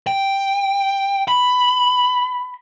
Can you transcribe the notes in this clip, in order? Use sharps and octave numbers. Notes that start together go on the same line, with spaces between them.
G5
B5